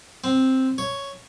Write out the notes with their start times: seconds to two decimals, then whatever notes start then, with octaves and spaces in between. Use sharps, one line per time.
0.24 C4
0.78 C#5